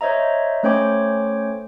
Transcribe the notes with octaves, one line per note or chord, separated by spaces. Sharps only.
C5 C#5 D#5 E5 A#5
A3 C#4 C5 C#5 G5 D6